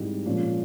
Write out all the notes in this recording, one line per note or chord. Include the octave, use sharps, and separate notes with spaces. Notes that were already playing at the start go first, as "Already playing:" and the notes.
Already playing: G#2 E3 G3 C4 D#4
A#2 F3 G#3 C#4